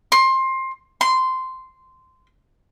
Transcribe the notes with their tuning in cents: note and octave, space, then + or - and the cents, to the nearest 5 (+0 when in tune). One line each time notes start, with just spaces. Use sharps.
C6 +20
C6 -10